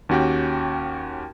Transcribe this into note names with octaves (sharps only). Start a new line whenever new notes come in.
D#2 C#4 F#4 G4 G5